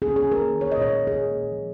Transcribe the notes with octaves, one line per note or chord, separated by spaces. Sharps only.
C#4 G#4
C#4 G#4
A#3 A#4
D#3
A#3 C#5
D#5
A#2 C#5
G#3
A#2 G#4
A#3
A#2
F3